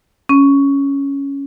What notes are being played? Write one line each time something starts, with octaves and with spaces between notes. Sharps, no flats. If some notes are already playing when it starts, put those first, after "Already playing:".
C#4